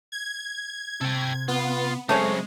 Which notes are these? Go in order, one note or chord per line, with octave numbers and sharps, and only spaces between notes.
G#6
C3 A4 G5
B3 F4
F#2 C#3 G#3 A3 C4 C#4 C#5